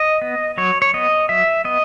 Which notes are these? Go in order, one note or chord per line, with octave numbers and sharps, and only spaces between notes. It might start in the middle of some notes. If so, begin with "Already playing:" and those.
Already playing: D#5
B3
F#3 C#5
C#5
B3 D#5
F#3 E5
B3 D#5